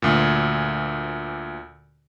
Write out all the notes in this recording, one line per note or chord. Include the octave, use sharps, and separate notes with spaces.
D2 A#2